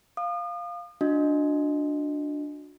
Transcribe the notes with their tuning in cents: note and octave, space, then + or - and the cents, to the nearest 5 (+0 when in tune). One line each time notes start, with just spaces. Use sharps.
F5 +0 D#6 -40
D4 +0 F#4 -30 D#5 +0